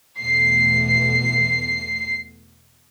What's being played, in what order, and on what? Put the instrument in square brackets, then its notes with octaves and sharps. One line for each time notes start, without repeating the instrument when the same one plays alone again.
[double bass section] E2 B2 A3 [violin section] C7